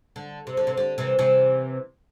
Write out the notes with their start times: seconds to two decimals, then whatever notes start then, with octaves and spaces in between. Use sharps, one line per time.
0.16 D3
0.47 C3
0.57 D3
0.67 C3
0.77 D3
0.98 C3 E3
1.19 C3 E3